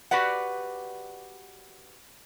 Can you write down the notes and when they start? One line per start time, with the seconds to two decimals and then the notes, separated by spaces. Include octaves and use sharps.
0.11 F#4 G4 B4 D5 F#5